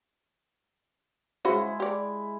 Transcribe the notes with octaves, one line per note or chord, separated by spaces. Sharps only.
C#3 G#3 E4 F#4 C5
G4 D5